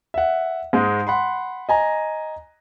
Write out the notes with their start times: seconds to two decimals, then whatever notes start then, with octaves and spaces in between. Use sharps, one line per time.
0.14 E5 F#5
0.73 G#2 G#3
1.07 F#5 B5 C6
1.69 D#5 G#5 A#5